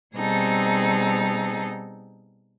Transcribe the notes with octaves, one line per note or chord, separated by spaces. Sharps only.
B2 G3 C4 D#4 G#4 A4